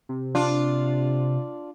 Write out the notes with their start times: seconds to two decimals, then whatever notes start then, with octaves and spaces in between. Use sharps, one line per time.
0.09 C3
0.35 D4 F4